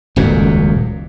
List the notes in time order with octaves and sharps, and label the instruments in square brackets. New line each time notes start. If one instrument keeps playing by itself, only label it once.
[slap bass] D#1 C#2 F#2 A#2